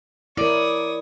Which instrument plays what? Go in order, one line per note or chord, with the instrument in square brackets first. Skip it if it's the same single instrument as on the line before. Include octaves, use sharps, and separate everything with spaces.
[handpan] E4 A#4 [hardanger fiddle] C#5 D#6 [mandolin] D5